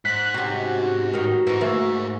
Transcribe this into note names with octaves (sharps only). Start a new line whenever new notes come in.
G#2 F#6 B6
C3 C#4 F#4
A2 D#3 A#4
G#2 E3 D#4
A3 A#3